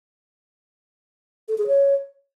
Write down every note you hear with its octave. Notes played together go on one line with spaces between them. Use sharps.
A4
G#4
C#5